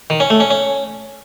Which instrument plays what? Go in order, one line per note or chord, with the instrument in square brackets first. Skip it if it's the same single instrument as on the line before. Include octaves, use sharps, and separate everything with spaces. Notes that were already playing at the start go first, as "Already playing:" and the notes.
[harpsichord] D#3
C#4
A3
C#4
C#4